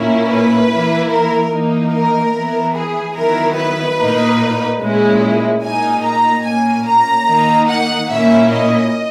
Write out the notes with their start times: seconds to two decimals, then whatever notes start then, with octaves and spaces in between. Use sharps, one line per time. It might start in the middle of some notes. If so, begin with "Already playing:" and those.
Already playing: A#2 A#3 C#4 E4
0.27 B4
0.69 E3 A#3 E4
1.10 A#4
1.51 E3 A#3 D#4
1.92 A#4
2.34 E3 B3 E4
2.74 G#4
3.15 D#3 F#3 B3 E4 A#4
3.57 B4
3.98 A#2 A#3 D#4
4.80 A#2 G#3 C#4 E4
5.62 A#2 A#3 D#4 G#5
6.03 A#5
6.44 A#2 A#3 C#4 G#5
6.86 A#5
7.27 D#3 A#3 D#4
7.68 F#5
8.09 A#2 A#3 C#4 E4 E5
8.50 D#5